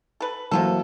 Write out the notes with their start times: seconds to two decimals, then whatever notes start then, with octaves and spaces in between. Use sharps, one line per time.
0.20 A4 B4
0.51 C3 E3 F#3 A#3 F4 A4